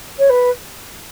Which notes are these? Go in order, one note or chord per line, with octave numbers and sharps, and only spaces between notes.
C#5
B4